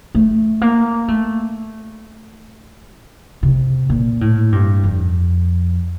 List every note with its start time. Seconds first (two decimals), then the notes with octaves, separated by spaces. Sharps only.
0.15 A3
0.61 A#3
1.08 A3
2.96 D3
3.43 C3
3.90 A#2
4.21 A2
4.52 G2
4.84 F2